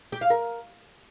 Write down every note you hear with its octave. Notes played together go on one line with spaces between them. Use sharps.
G4
F5
A#4